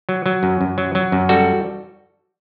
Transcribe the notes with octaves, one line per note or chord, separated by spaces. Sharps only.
F#3
F#3
F#2
F#2
F#3
F#3
F#2
G3 F#4 A4